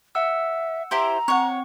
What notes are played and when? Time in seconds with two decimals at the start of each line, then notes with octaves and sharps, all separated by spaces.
0.15 E5 F#5 E6
0.91 E4 G4 C5 A#5
1.28 C4 C#5 F#5 C#6